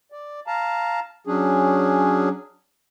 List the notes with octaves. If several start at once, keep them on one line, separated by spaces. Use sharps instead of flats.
D5
F5 A5 A#5
F#3 C#4 D4 G#4